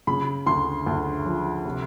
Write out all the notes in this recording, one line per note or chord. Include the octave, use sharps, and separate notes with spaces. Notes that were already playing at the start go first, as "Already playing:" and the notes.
C#3 B5
D2 C6
D2
F3
C3